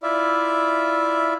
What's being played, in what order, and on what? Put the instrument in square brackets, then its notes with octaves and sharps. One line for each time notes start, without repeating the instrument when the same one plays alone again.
[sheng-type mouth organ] E4 F4 D5 E5